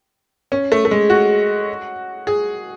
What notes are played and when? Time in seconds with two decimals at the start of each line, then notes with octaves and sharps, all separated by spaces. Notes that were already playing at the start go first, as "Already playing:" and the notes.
0.52 C#4
0.72 A3
0.85 A3
0.91 G#3
1.10 F#4
2.27 G#4